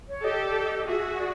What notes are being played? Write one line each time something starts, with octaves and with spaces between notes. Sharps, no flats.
C#5
G4 A4 D#5
D5
D#5
D#5
F#4 G#4 E5
D5